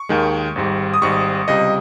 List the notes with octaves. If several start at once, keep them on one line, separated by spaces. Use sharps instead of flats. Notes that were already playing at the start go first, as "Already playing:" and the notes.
Already playing: C#6
D#2 D#3 G#3
G#1 G#2 G3
D#6
G#1 G#2 G3 C#6
C#2 C3 G3 D#5